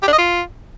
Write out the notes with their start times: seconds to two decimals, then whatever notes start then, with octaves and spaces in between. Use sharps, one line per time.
0.02 G4
0.08 D4
0.13 D#5
0.18 F4